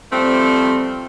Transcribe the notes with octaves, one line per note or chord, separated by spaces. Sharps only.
F3 G3 A3 C4